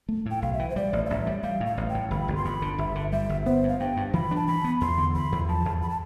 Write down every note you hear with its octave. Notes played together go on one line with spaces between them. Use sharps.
A3
A2
G5
B1 F5
E5
E3
C5
G3 D5
A1
F5
A1 E5
G3
G3 F5
A2
F5
A1
G5
A2
G1 B5
G1
C6
F2 B5
D3
G1 E5
D3
G3 E5
G1
B3 C5
G2
F5
G2 G5
G2
E3 B5
D4 A5
E3 B5
B3
E2 C6
D3
E2 B5
E2
F3 A5
E2
B5
A5